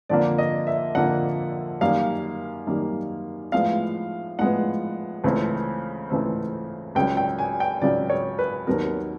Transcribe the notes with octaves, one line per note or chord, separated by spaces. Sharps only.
F2 D3 F3 A#3 D5
D#5
E5
F2 D3 F3 A#3 F#5
F#2 D#3 G3 A#3 F5
F#2 D#3 G3 A#3
A2 F3 G#3 B3 F5
A2 F3 G#3 B3 F#5
C#2 C#3 E3 A3 C4
C#2 C#3 E3 A3 C4
C#2 C#3 F#3 G5
G5
G#5
G5
C#2 C#3 F#3 D5
C#5
B4
D#2 D#3 F#3 B3 A#4